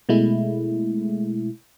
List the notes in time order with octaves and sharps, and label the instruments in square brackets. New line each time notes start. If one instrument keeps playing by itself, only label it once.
[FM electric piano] B2 G#3 A3 E4